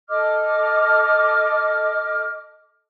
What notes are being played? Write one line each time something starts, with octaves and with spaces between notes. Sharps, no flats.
A4 D#5 D6 F6